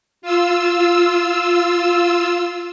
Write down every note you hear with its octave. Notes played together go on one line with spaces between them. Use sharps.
F4 E6